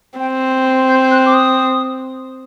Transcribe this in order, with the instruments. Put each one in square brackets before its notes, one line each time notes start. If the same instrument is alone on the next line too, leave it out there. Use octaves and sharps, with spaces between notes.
[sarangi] C4 [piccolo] G5
[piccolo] C6
G6
G6
F#6
D6
D#6